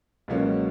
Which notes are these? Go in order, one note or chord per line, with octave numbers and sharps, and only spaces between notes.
C#2 B2 F#3 A#3 C#4